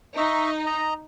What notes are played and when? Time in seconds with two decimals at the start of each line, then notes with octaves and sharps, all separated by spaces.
0.18 D#4 D#5 E5 C#6
0.66 D#5 A#5